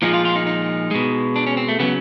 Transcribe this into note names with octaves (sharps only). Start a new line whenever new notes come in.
A#2 F3 G#3 D#4
F4
F4
D#4
D#4
B2 G#3
D4
C#4
C4
A3
C#3 F#3 B3